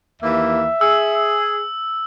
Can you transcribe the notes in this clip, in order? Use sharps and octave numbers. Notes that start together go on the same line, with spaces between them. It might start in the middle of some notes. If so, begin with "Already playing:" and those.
D#2 E3 A#3 E5
G#4 E6